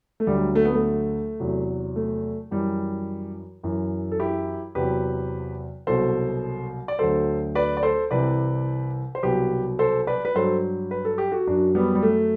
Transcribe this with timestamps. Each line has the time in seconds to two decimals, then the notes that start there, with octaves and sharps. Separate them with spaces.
0.20 A3
0.27 D2 D3 F#3 G3
0.55 A3
0.65 B3
0.74 A3
1.40 E2 C3 F#3
1.96 A3
2.51 F#2 E3 G3
3.63 F#2 E3
4.12 A4
4.20 E4 G4
4.75 E2 C3 F#3 G4 B4
5.87 C2 B2 F#3 A4 C5
6.88 D5
6.99 D2 D3 F#3 A4 C5
7.55 B4 D5
7.77 D5
7.83 A4 C5
8.11 C2 C3 E3 B4 D5
9.15 C5
9.23 C2 B2 F#3 G4 B4
9.79 A4 C5
10.07 B4 D5
10.25 B4
10.35 G2 F#3 A4 C5
10.91 B4
11.05 A4
11.18 G4
11.31 F#4 A4
11.47 F#2 F#3 D4 F#4
11.75 G3 B3
11.95 G3
12.03 A3